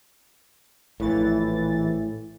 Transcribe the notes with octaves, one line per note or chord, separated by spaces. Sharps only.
A#1 A2 E3 A6